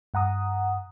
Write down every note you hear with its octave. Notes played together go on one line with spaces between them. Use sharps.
G2 F#5 A#5 D#6